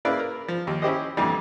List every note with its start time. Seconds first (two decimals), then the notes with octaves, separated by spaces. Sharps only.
0.05 C#3 A#3 E4 B4 D5 F5
0.19 A#4
0.48 F3
0.67 D#2
0.82 C#4 E4 G4 C5 D#5
1.17 F2 A#2 D3 E3 G3